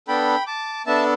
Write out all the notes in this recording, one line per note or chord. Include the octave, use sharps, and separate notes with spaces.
B3 D4 A4 G5 B5
A5 D6
B3 D4 A4 E5 A5